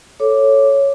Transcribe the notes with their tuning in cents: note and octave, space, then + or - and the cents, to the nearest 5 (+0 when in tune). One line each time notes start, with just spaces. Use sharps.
A4 +0 C#5 +0 D6 +0